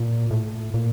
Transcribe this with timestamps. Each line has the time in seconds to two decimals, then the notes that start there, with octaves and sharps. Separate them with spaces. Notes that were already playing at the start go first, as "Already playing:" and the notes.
Already playing: A#2
0.31 A2
0.74 A#2